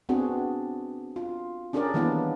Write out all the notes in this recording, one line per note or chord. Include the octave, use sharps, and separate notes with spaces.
B3 C4 D4 F#4 G#4
F4
C#4 D4 G4 G#4 A#4 D5
D#3 E3 G3 A#3 B3 E4